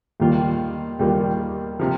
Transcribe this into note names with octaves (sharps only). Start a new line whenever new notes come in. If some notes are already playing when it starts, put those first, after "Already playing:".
D#2 D#3 G3 A#3 F4
D#2 D#3 G3 A#3 F4
C3 F3